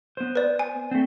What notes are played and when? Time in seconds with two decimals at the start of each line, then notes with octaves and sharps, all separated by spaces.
0.17 B3 C5
0.35 B4 D5
0.59 G#5
0.91 A3 C4